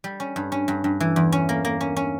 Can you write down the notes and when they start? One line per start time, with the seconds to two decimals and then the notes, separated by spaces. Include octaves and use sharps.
0.04 G3
0.20 C#4
0.36 G2
0.52 C#4
0.68 G2
0.84 G2
1.00 E3
1.16 E2
1.32 C#4
1.49 A#3
1.65 A#3
1.81 C#4
1.97 C#4